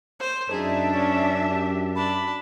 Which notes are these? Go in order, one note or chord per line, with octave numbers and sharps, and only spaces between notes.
C5
F#2 D4 D#4 G#4 E5 A5
C#4
G4
D4 A5 B5